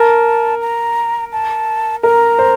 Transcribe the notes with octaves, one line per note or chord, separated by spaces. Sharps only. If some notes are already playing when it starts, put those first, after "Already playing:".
Already playing: A#4 A5
A#5
A5
A#4 A#5
C5